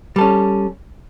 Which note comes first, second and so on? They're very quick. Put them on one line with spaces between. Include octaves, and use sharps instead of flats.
G3 A4 C#4